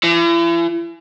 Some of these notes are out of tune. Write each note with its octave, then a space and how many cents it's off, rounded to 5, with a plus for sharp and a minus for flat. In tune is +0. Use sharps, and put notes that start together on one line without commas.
E3 +40